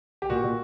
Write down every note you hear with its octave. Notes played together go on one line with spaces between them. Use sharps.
G4
A#2 F#4
A#2